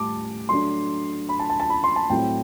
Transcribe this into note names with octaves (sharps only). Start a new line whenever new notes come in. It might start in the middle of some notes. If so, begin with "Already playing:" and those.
Already playing: A2 G3 A5 D6
F#3 A3 D4 C6
B5
A5
A5
A5
B5
C6
A5
A2 F#3 A3 C4 E4 G5